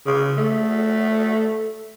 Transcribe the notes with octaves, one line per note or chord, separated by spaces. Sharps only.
C#3
A3